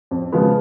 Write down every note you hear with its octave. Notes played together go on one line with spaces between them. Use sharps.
F2
C#3 F3 G#3 B3